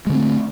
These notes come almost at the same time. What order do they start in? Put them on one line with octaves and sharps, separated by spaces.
G#3 D3 C4 A3